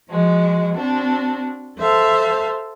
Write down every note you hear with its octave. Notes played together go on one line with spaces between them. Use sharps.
F3 G#3 F#4
C4 D4 F#4
A4 C5 E5 F5 A5